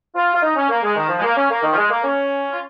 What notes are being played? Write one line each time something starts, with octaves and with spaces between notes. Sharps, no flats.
F4
F4
D#4
C#4
A#3
G#3
D#3
F3
G#3
A#3
C#4
A#3
D#3
F3
G#3
A#3
C#4
F4